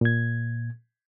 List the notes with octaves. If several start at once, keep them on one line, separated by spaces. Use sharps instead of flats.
A#2 G#6